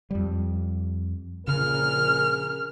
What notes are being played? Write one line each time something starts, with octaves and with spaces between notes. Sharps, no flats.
F2 G3
A#1 C#3 G#4 A#4 F6